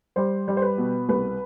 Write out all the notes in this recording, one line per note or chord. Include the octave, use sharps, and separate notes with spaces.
G3 C5
G3
C5
B4
B2
C2 B4